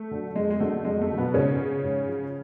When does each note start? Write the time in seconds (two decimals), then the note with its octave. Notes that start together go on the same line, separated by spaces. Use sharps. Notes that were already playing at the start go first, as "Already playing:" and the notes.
Already playing: A3
0.11 D3 F#3
0.35 F2 G#3
0.50 G#3
0.60 D3 F#3 A3
0.85 F2 G#3
1.01 A3
1.10 D3 F#3
1.18 B2 B3
1.34 G#2 C#3 C#4
1.59 F3
1.84 G#2
2.08 F3